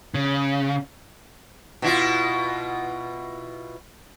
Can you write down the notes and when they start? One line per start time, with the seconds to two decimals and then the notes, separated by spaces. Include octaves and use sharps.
0.14 C#3
1.82 B2 E4 F4